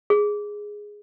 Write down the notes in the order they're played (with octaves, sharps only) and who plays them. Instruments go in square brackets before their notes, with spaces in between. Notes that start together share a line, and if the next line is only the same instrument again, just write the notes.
[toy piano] G#4